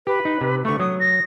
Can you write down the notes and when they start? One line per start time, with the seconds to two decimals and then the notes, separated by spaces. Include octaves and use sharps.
0.07 G4 B4
0.25 D#4
0.41 C3
0.65 D3 A3 C#6
0.80 F#3 D#6
1.00 A#6